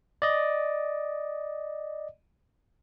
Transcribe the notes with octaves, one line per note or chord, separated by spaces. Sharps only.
D5 D#5